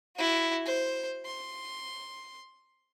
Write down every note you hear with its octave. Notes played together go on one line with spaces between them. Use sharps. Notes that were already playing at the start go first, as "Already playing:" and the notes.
E4 F#4
C5
C6